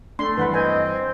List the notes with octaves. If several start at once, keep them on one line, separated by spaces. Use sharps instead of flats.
A3 D4 C6
G2 E3 B4 F#5 B5
C4 B4 D#5 G#5
C5